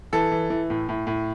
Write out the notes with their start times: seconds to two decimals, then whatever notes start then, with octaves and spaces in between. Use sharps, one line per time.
0.13 E3 A4
0.32 E3
0.50 E3
0.70 A2
0.89 A2
1.07 A2